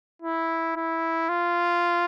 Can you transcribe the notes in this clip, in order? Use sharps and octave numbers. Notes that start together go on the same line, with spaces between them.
E4
E4
F4